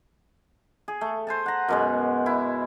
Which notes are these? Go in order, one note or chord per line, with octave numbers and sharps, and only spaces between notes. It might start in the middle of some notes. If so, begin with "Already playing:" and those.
G#4
A3
C5 G#5 A5
F#5 A#5
F#2 B2 G#3
E4